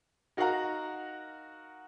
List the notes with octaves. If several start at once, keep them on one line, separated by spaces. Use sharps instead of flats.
D#4 F#4 A#4 F5 F#5 A#5